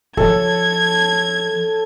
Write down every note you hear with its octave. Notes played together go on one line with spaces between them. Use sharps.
F3 A4 C#5 G#6